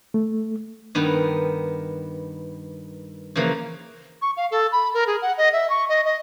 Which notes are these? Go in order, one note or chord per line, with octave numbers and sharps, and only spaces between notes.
A3
G2 D#3 B3
C#3 E3 F3 A#3
C#6
F5
A4
B5
A#4
G#4
F#5
D#5
E5
C#6
D#5
D#5